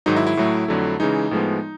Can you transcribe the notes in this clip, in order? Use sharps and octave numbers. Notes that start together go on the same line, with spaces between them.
G#2 D#3 F#3 D#4
E4
E4
A2 F#3 A3
F2 D3 F#3 A3
C#3 E3 G#3 D#4
A2 F3 G#3 B3